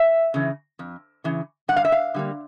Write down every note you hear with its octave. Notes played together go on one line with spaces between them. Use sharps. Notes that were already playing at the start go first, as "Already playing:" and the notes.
Already playing: E5
C#3 E3
F2
C#3 E3
G2 F#5
F5
E5
F5
D3 G3 A#3